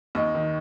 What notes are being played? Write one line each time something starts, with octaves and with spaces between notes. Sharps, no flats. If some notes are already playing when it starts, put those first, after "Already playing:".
D#2 D#5
D#3